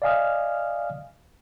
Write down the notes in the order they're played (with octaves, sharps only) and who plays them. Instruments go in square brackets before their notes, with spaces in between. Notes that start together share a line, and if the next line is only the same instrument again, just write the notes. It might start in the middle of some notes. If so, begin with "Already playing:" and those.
[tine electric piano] D5 D#5 F5 G#5 D#6 F6